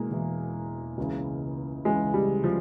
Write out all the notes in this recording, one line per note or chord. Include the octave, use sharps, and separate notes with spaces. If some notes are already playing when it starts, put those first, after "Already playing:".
Already playing: E1 E2 E3 G#3 A#3
E1 E2 E3
C#2 C#3 E3
C#2 C#3 E3 G#3
G3
F3